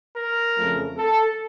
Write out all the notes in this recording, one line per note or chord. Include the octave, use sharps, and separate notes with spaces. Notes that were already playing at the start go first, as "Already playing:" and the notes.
A#4
F2 C#3 F3 A3
A4